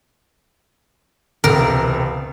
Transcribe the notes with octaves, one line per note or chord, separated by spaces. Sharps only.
E1 C#2 C3 A#4